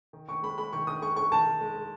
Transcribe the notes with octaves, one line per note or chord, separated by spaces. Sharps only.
D#3
D#3 C#6
G#3 B5
G#3 B5
D#3 C#6
D#3 D#6
G#3 C#6
G#3 C#6
D#3 A5
D#3
G#3
G#3